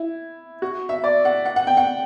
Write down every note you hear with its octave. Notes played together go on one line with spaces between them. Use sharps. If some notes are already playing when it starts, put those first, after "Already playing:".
Already playing: E4
F#4
E5
D5
F#5
F#5
F#5
G5
F#5